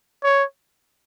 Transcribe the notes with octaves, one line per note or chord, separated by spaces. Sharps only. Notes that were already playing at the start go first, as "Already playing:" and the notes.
C#5